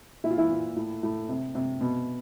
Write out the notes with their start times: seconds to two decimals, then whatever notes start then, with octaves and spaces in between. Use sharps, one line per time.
0.24 A#2 E4
0.31 F4
0.38 E3 E4
0.51 A#2
0.76 A2
1.03 A2
1.29 C3
1.55 C3
1.81 B2